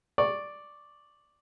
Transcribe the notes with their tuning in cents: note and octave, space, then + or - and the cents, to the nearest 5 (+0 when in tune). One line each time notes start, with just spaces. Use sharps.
D5 +0 C#6 -10